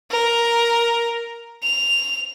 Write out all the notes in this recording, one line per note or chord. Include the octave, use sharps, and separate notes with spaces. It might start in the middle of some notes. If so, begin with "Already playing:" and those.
A#4
F7